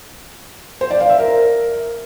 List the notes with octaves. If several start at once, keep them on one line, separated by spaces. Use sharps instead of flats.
C5
D5
F5
E5
A#4